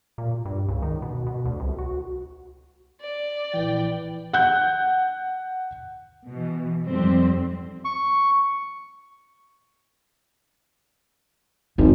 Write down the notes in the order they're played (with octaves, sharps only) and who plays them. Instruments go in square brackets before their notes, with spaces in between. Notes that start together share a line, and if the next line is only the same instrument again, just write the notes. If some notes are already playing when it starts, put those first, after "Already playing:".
[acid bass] A#2
G2
C#2
D#3
B2
B2
D2
C2
F#4
[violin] D5
[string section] A#1 B4 G5 [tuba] E3
[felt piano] F#5 F#6 G6
[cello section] B2 E3
F2 G#2 G3 C4
[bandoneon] C#6
[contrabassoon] G#1 [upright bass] F2